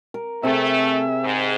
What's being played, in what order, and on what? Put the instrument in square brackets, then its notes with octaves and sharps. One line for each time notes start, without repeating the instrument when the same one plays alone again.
[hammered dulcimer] A#4
[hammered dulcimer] C3 G#4 [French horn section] A3 [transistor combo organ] E5
[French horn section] G#2